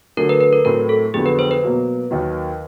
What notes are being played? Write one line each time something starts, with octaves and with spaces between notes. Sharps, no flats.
D3 F#3 A3 A#4
B4
B4
A#4
A2 F#3 A3 C4 A#4
A4
F2 D3 F#3 B3 G#4
B4
C5
B4
B2 F#3 A#3
D#2 D#3 F#3